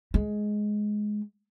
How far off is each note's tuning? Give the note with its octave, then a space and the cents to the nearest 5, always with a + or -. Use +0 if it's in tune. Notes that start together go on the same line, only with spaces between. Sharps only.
G#3 +10